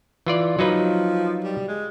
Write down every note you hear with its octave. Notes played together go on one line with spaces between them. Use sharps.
E3 F4 D5
F3 F#3 D#4 B4
G3
G#3